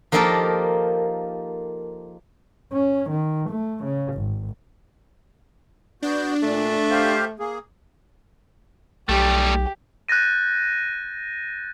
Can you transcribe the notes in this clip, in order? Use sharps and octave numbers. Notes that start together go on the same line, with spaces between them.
F3 A#3 D#4 G4 A4 A#4
C#4
D#3
A3
C#3
G#1
B3 D4 F#4 G6
A#2 A3
G4 C5 F5
A#3 G#4
B1 G3 A3 G4
F#6 G6 A6 A#6 D#7